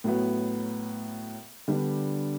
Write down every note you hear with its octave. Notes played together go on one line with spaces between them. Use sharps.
A2 F#3 B3
D3 G3 B3 D4